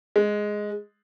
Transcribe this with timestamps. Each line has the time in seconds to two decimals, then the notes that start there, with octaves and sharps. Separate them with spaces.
0.16 G#3